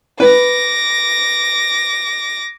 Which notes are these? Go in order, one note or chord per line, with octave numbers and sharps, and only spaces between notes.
B4 D6 A#6